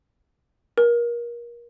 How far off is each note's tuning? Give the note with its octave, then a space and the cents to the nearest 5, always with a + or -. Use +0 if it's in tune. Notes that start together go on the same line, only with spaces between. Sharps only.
A#4 +30